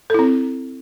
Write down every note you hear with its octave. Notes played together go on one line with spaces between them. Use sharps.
C4 E4 A4